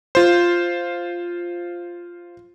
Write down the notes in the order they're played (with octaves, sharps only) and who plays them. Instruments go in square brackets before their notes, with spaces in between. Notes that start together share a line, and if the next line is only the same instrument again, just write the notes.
[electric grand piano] F4 C5